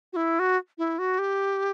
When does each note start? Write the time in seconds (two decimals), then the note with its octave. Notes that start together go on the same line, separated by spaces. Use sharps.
0.13 F#4
0.16 E4
0.39 F#4
0.78 E4
0.99 F#4
1.19 G4